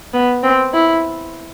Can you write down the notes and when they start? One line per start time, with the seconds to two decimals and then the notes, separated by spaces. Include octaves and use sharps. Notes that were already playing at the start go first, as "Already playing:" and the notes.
0.14 B3
0.43 C4
0.74 E4